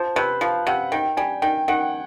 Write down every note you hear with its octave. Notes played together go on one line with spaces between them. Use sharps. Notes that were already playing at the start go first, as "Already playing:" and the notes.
Already playing: F3 C5
C3 B4
F3 F5
C3 F#5
D#3 G5
G3 G#5
D#3 G5
D#3 F#5